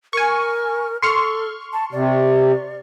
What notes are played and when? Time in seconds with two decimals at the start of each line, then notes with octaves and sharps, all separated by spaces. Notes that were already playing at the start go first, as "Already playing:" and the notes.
0.13 A#4 G#5 C#6
1.02 A4 C6 C#6 F6
1.73 A5
1.93 C3 D5